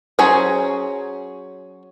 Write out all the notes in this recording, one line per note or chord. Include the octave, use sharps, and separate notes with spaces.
F#3 C#4 G#4 C5 C#5